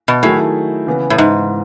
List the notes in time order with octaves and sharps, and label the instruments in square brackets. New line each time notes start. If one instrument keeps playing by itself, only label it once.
[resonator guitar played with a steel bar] B2
[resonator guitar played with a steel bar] A2 [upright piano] D#3 F#3 A3 E4 G#4
[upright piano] C#3 E3 B3
[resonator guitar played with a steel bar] A2
G#2